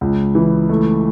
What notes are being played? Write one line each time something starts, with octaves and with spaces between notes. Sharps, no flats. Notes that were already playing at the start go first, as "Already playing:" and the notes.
C#2
E3
A3